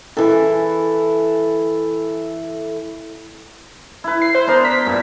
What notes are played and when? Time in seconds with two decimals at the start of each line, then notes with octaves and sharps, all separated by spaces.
0.17 E3 A4
4.04 E4 B4
4.22 C7
4.35 C5
4.47 B3 D4 A#4
4.65 B6
4.85 G2 A#2